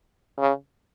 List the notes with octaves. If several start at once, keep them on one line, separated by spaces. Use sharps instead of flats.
C#3